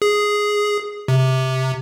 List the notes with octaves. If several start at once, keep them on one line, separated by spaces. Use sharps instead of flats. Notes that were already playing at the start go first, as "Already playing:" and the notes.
G#4
C3